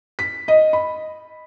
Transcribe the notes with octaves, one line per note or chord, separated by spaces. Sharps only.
B6
D#5
B5